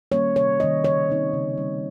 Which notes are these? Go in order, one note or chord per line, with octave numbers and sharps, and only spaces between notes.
D#3 G3 A#3 C#4 C#5
C3 C#5
D#3 G3 A#3 C#4 D#5
C#3 C#5
G3 C4 D#4
C#3
G3 C4 D#4